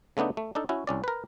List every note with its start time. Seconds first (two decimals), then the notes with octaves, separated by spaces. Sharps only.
0.17 C#3 A3 B3 D4 D#4
0.37 A3
0.55 D4 D#4 A4
0.69 C#4 E4 F#4
0.87 C2 C#4 D5
1.04 A#4 B4